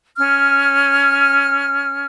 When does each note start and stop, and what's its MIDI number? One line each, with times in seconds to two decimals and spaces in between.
0.17 2.05 61
0.17 2.05 89